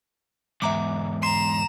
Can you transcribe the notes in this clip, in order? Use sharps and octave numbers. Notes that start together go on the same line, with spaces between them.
E2 G#2 E5 A#5 D6
A#5 C6 C7 E7